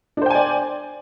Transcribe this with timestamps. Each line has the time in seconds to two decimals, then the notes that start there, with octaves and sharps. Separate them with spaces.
0.17 D4
0.22 C5
0.26 G5
0.30 G#5
0.35 D5